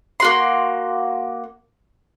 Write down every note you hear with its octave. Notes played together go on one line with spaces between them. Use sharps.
A#3 F#4 C6